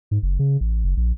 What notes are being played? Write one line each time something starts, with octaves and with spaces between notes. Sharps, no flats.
G#2
F#1
C#3
A1
F#1
A#1